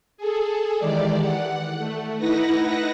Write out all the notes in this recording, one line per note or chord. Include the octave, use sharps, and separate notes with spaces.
G#4 A4
D#3 E3 G#3 G4 D5
F#5
A3
D#4 E4 B4 F#5 A#6